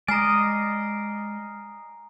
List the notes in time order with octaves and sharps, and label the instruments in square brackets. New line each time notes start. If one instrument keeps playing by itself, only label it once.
[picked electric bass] G#3 [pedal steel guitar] D5 D#5 [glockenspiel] G#5 A#5 [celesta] F6 C7